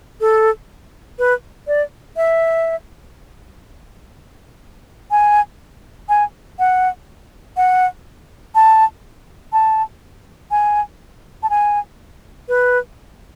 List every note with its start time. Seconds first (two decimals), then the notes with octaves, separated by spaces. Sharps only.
0.21 A4
1.19 B4
1.67 D5
2.17 E5
5.11 G#5
6.09 G#5
6.59 F#5
7.57 F#5
8.55 A5
9.53 A5
10.51 G#5
11.43 A5
11.50 G#5
12.49 B4